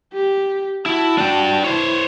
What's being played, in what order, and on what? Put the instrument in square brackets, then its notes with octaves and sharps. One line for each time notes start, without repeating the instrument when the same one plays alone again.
[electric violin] G4
[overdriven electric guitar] E4 [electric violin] F#4 A5
[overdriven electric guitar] D4 G5
[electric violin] E4 [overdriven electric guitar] C5 C#5